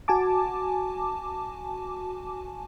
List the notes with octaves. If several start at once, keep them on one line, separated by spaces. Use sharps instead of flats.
F#4 G#5 A5 D6